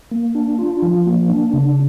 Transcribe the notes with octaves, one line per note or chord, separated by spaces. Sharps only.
A#3
D4
F4
F3
A#3
D4
C#3